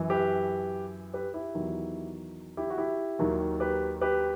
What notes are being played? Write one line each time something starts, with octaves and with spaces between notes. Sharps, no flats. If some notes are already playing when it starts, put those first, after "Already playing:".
Already playing: F#2 E3
G4 B4
G4 B4
E4 G4
E2 D#3 F#3
E4 G4
F#4
E4 G4
D#2 D#3 F#3
G4 B4
G4 B4